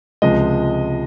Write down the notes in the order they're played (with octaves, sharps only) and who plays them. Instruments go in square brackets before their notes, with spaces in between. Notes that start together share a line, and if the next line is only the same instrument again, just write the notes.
[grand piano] C#2 C3 F3 G#3 D#5